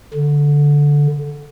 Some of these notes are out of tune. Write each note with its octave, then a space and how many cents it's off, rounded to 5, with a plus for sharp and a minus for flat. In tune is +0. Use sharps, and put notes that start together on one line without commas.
D3 -10